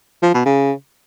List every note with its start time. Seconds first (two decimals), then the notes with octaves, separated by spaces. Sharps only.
0.23 F3
0.34 B2
0.46 C#3